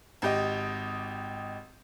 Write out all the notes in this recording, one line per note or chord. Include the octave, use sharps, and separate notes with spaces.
G#1 G4 D#5